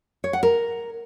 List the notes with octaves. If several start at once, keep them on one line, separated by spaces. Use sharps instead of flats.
C#5
F#5
A#4